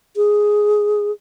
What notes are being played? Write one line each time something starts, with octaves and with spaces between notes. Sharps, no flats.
G#4